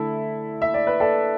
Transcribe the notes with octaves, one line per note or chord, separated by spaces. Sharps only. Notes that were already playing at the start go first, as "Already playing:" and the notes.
Already playing: D3 A3 E4 A4
E5
D5
B4
A4 D5